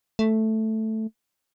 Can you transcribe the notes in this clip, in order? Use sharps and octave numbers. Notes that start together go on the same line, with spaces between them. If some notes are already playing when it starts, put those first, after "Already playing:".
A3